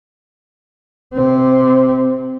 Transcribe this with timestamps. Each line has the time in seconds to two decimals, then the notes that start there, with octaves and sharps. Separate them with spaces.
1.14 C3 C4